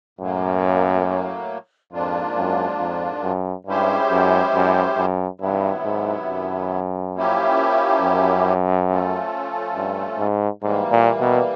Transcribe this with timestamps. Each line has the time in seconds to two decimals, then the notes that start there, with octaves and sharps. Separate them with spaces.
0.19 F#2 A2 F#3 A#3
1.92 F2 G#2 F3 A#3 D4 F4
2.37 F#2
2.79 F2
3.24 F#2
3.66 G2 G#3 C#4 E4 G4 C5
4.11 F#2
4.54 F#2
4.97 F#2
5.41 G2 C3 D#3 F#3 B3 E4
5.84 G#2
6.28 F#2
7.15 F3 A#3 C#4 E4 G4
8.01 F#2
8.88 F3 A3 C#4 F4 A4
9.75 G2
10.18 G#2
10.62 G#2 E3 G3 A#3
10.91 A#2
11.20 B2